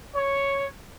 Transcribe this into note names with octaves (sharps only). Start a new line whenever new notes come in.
C#5